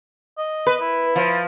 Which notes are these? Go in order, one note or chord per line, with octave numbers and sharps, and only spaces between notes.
D#5
B4
E4
F3